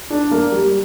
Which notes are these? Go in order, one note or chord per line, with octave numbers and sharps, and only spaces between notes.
D4
A#3
G3